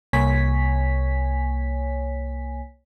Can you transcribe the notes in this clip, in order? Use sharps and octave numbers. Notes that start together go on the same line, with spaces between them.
C2 A#3 C#5 G#5 B6